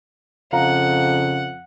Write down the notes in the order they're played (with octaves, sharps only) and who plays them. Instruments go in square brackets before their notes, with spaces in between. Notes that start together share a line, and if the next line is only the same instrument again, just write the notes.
[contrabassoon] F2 [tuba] C#3 [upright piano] F5 A#5 [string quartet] F#5